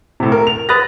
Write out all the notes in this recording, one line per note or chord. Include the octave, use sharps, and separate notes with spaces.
A2 C3
A#4
F7
B4 B5 D#6 F#6 A6 A#6